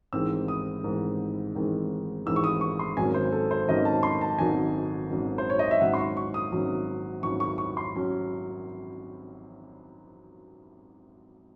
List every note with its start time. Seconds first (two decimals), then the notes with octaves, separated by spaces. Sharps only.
0.13 A1 G#2 D#3 G#3 C4 E6
0.48 D#6
0.84 A1 G#2 D#3 G#3 C4
1.55 A1 G#2 D#3 G#3 C4
2.26 A1 G#2 D#3 G#3 C4 E6
2.36 C#6
2.44 D#6
2.61 C#6
2.79 C6
2.97 G#1 G#2 D#3 F#3 C#4 G#5
3.14 C5
3.32 A4
3.51 C5
3.68 G#1 G#2 D#3 F#3 C#4 D#5
3.85 A5
4.03 C6
4.21 A5
4.39 G#1 G#2 D#3 F#3 C#4 G#5
5.10 G#1 G#2 D#3 F#3 C#4
5.38 C5
5.50 C#5
5.59 D#5
5.71 E5
5.80 G#1 G#2 F#3 C#4 F#5
5.94 C6
5.99 C#6
6.17 C#6
6.34 D#6
6.52 G#1 G#2 F#3 C#4
7.23 G#1 G#2 F#3 C#4 C#6
7.40 C#6
7.58 C#6
7.77 C6
7.95 F#3 C#4